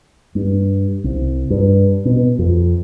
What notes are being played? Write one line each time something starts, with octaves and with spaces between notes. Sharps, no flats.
G2
C2
G2
B2
F2